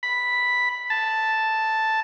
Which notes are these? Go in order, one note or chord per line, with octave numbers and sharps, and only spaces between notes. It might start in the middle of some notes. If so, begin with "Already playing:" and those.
B5
A5